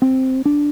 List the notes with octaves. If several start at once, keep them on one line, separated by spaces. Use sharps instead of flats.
C4
D4